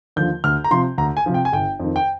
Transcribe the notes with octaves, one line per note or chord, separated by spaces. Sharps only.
D#2 D3 F3 G6
D2 F6
A#5
C3 F3 C6
D2 A#5
G#5
C3 F3
G5
G#5
G1 G5
F2 D#3
G5